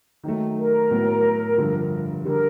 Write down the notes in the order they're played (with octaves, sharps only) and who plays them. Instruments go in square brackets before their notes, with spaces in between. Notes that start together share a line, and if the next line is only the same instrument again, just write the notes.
[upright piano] D#3 F#3 A3
[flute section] A#4
[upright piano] A2 F#3 B3
G2 D3 F3
[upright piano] D3 G3 [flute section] A#4